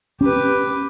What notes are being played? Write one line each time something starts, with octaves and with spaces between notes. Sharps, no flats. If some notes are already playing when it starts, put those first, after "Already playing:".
C#4 G4 B4